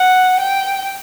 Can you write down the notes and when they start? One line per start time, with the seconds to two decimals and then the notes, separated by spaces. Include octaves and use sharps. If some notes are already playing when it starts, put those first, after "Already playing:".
Already playing: F#5
0.39 G5